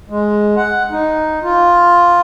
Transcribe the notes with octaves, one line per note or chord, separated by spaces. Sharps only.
G#3
F#5
D#4
F4